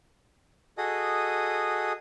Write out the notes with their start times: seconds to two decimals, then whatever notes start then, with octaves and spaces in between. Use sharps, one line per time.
0.78 F#4 G#4 A4 D#5 D#6